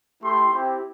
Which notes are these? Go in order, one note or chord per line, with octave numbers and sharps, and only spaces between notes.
A3 E4 G4 C6
C4 E4 G4